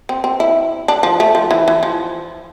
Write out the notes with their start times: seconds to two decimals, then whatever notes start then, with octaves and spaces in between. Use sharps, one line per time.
0.09 C4
0.24 C4
0.40 E4
0.88 D4
1.03 F3
1.20 A3
1.35 F3
1.51 E3
1.68 E3
1.83 F3